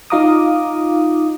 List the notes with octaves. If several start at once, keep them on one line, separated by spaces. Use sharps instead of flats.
D#4 F4 F5 A#5 D6 D#6